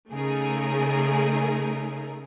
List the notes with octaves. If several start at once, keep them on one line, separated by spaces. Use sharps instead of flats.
C#3 A3 D#4 G#4 A#4